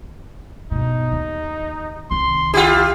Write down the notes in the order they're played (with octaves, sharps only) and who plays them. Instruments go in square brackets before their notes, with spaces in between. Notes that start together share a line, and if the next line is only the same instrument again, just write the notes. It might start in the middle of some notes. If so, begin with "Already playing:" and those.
[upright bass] G2 B2 [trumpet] D#4
[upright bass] D#2
[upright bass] C2 D#3 [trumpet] C6
[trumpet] E4 [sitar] F4 G4